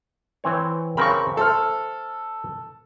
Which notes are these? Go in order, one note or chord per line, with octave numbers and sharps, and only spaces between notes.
E3 C4 C#5
C#3 C4 A#4 B5 C#6
A3 A4 C5 E5 F6